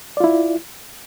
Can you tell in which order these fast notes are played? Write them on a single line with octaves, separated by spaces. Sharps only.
D5 F4 E4